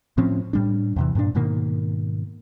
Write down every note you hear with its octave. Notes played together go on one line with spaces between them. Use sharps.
A2 F3 C4 C#4
A2 G3 D4
E2 C3 E3
G2 A#2 G#3 D4
G#2 B2 D#3 A#3